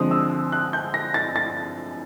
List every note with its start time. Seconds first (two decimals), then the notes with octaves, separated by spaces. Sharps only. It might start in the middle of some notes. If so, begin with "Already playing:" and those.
Already playing: D3 F3 G#3 C4 D#6
0.11 E6
0.52 F#6
0.73 G6
0.94 A#6
1.14 A6
1.36 A6